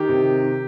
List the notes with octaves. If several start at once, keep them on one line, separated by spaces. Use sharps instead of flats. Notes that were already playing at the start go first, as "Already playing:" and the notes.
Already playing: D#3 G4
C3